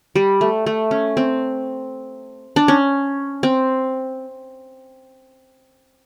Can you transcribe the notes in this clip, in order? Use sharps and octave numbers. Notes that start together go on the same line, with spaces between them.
G3
A3
A3
C#4
C4
D4
C#4
C4